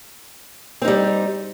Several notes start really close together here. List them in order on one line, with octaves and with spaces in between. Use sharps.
C4 D#4 G3